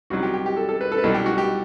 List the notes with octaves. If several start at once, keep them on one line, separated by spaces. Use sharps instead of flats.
C2 C3 F#3 F#4
G4
G4
G4
A4
A4
B4
A4
B4
C2 B2 F#3 A4
G4
F#4
G4